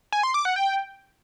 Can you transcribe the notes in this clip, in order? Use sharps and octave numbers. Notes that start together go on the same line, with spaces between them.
G#5
C6
D6
F#5
G5